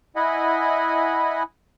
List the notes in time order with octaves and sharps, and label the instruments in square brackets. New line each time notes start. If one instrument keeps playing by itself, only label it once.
[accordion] E4 D#5 F#5 G#5 B5